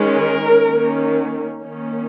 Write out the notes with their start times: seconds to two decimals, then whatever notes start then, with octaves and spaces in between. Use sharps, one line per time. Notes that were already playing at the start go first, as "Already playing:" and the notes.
Already playing: D#3 G#3 C#4
0.18 A#4
0.66 D#3 A#3 C#4
1.62 D#3 A#3 C#4